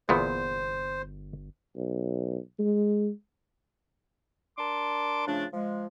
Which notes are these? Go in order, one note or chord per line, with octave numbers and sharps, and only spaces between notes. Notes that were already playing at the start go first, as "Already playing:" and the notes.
G1 E2 A#2 B3 C5
B1
G#3
D4 A#4 A5 C6 D6
C#3 F3 A3 D4
F3 G#3